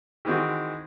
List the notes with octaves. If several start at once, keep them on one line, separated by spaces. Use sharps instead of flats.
D#3 E3 G#3 C4 F#4